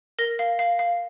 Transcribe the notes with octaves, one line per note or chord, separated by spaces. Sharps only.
A#4 A#6
F5
F5
F5